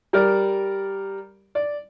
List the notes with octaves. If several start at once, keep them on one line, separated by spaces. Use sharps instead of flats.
G3 A#4 D5
D5